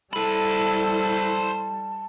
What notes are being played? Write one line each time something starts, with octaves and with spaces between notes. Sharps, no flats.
G3 E4 A4 C5 A5 B5